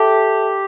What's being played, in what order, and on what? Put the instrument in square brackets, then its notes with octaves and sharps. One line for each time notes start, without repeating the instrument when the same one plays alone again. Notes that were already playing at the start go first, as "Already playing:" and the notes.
Already playing: [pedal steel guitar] G4 [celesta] A4 E5 A5 D6